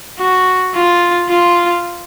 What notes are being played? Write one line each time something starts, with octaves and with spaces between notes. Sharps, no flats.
F#4
F4
F4